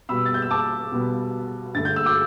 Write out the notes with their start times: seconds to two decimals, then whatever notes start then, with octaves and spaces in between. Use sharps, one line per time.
0.09 B2 G3 B3 B5 E6
0.26 A6
0.34 G6
0.42 E6
0.51 A5 D6
0.92 B2 G3 B3
1.75 G2 D3 A3 A6
1.85 G6
1.96 E6
2.06 D6 G6